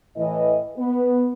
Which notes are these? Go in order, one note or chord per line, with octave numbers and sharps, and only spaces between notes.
A2 E3 D#5
B3